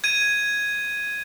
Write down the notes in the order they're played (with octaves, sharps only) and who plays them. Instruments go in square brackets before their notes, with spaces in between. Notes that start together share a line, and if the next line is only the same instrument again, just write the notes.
[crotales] G#6 D#7